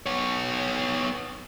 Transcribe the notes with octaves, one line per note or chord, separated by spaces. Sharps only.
B3 C#5